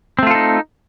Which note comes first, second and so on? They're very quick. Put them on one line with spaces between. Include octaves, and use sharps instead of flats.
C4 A3 F4 A4 D#4